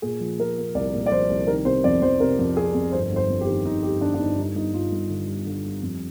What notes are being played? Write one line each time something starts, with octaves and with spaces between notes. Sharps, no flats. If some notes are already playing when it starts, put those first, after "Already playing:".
A#2 G#4
F3
F3 A#4
A#3
C2 D5
A#2
D5
F3 C5
C2
D#3 A#4
C3 C5
F2 D5
F2 C5
C3 A#4
F2
C3 G#4
F2
G1 C5
G1 C5
F2
G4
D#3
G1 D#4
G1 G4
D#3 D4
D4
G1 D#4
G3 D#4
G2 D#4
G2 F4
G2
D3
G3
D3
G3
F2